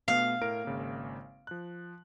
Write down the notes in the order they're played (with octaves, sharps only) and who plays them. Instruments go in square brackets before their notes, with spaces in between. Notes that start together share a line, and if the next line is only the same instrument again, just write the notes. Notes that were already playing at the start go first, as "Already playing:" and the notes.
[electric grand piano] B2 A3 B3 [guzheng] F5
[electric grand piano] A2 A#4 D7
G#1 C#3 A#3
F3 F#6